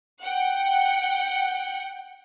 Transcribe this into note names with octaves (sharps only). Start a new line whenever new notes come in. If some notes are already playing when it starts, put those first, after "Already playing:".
F#5 G5